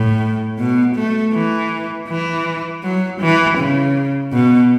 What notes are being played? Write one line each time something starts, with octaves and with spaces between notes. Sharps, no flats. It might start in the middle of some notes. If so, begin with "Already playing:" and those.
Already playing: A2
B2
A3
E3
E3
F#3
E3
C#3
B2